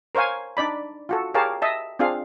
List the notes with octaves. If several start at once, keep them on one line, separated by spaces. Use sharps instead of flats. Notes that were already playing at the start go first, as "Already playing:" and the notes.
A#4 C5 C#5 F5 G#5
D4 D#4 D5 B5
F4 F#4 A4
G4 G#4 A#4 C#5 F5 A5
D#5 E5 A5
C4 D4 F4 G#4 F5